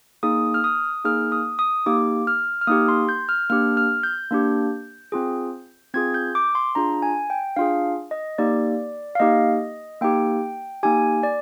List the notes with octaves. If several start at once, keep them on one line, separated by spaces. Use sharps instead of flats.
A#3 D#4 G#4 D#6
F6
D#6
A#3 D#4 G#4 F6
D#6
D#6
A#3 D#4 G4 D6
F6
F6
A#3 D#4 G4 D#6
C6
G6
F6
A#3 D4 G4 F6
F6
G6
A#3 D4 G4
C4 F4 G#4
C4 F4 G#4 G#6
G6
D6
C6
D4 F4 G#4 A#5
G#5
G5
D4 F4 G#4 F5
D#5
A#3 D#4 G4 D5
F5
A#3 D#4 G4 D#5
A#3 D#4 G4 G5
A#3 D#4 G4 G#5
D5